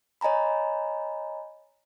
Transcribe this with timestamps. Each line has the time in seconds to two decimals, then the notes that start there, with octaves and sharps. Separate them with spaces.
0.21 C#5 D#5 G#5 A#5 B5